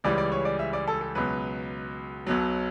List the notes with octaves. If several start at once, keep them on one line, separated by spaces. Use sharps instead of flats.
C#2 C#3 E3 G3 D5
D5
C#5
D5
E5
D5
A4
A4
C#2 B2 F#3 B4
B1 B2 F#3